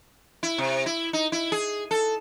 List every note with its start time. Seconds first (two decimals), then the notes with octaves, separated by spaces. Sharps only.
0.43 E4
0.58 C3
0.86 E4
1.13 D#4
1.32 E4
1.52 G#4
1.91 A4